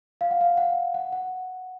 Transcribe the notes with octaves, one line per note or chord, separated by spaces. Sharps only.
F5
F#5
F5
F#5
F#5
F#5